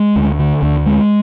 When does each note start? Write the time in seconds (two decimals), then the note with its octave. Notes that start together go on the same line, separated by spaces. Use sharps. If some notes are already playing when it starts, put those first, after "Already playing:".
Already playing: G#3
0.16 D2
0.39 D3
0.62 D2
0.86 G#3